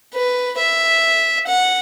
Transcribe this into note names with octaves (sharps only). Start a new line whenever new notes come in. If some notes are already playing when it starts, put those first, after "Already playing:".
B4
E5
F#5